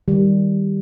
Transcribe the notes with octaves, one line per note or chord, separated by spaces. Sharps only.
D#3 G3